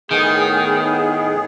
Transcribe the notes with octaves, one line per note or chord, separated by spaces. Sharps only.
A2 D#3 B3 G#4